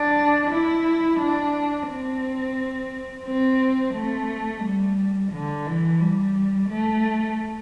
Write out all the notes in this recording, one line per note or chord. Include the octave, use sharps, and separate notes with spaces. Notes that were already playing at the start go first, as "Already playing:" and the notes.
Already playing: D4
E4
D4
C4
C4
A3
G3
D3
E3
G3
A3